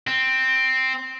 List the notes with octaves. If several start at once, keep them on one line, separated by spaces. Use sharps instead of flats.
C4